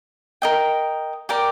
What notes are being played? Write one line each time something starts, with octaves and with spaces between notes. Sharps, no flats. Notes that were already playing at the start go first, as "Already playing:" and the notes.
A#4 D#5 G5
G4 A#4 D5 G5